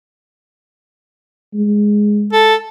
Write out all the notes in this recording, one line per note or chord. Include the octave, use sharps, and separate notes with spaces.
G#3
A4